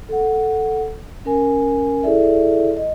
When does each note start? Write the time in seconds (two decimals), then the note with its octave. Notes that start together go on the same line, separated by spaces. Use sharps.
0.09 A4 F#5
1.25 C#4 A#4 G#5
2.03 E4 G#4 A4 D5 E5
2.77 D#5